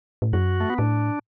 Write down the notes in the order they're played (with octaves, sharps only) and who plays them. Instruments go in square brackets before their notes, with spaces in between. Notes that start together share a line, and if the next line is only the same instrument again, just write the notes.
[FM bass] A2
[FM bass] F#2 [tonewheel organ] F#4
[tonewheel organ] A3
B3
[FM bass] A2 [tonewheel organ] D4